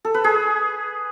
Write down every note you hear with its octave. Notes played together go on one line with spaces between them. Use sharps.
A4
B4
G#4